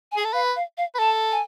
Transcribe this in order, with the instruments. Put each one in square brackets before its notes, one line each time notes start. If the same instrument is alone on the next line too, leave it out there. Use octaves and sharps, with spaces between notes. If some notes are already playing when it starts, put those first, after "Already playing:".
[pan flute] G#5
[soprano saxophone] G#4
A4
[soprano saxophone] B4 [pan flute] F5
[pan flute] F5
F5
[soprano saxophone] B4
[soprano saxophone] A4 [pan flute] A5
[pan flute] G#5